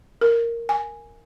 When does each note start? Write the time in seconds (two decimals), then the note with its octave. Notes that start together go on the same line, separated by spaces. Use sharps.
0.21 A#4
0.69 G#5